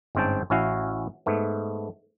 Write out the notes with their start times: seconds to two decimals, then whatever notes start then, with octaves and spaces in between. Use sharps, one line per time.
0.15 G1 G#2 C4 C#4 G5 A5
0.50 A1 C#4 E4 F#4 F5
1.26 G#2 A3 B3